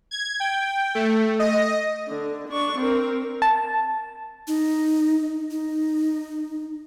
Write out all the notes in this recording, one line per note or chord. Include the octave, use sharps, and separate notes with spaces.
G#6
G5
A3
D#5
D3
D4 C#6
C4 A#4
A5
D#4
D#4